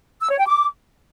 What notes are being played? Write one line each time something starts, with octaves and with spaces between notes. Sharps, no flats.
E6
C#5
G5
D6